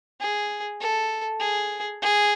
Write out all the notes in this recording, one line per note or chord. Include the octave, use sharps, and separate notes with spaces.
G#4
A4
G#4
G#4